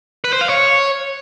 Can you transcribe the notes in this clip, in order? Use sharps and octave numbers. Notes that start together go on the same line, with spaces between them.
B4
C5
F5
C#5